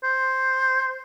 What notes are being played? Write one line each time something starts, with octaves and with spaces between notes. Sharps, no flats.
C5